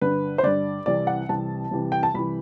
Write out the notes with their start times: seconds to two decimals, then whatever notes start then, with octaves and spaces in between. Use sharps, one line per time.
0.01 G2 D3 B4
0.38 C5
0.43 G2 D3 D5
0.86 C2 C3 E3 D5
1.07 F#5
1.29 C2 C3 E3 A5
1.71 C2 C3 E3
1.92 G5
2.03 A5
2.14 C2 C3 E3 B5